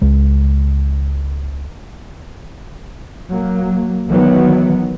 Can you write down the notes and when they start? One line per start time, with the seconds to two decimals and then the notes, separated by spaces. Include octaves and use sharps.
0.02 C#2 G#3
3.31 F#3 A#3
4.09 D#3 E3 F#3 B3